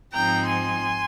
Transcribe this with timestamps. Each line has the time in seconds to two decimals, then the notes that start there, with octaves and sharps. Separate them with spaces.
0.14 G#2 F3 C4 D#4 G5 A#5
0.48 G#5 C6